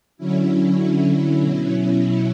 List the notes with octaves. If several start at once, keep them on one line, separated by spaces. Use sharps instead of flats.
D3 F#3 C#4 E4
B2 F#3 C#4 E4